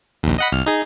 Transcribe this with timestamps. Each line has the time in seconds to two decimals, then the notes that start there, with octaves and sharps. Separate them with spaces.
0.23 A#1 D#2
0.38 D#5 F#5 B5
0.52 C2 F6
0.66 D#4 G#4